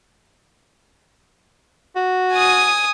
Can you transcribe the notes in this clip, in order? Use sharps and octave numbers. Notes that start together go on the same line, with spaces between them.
F#4
G#5 D#6